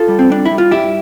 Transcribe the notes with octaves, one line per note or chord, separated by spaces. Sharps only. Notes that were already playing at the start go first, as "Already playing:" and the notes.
Already playing: F4 A4
G3
C4
G3 D4
E4
G3
F4
G2 E4 G4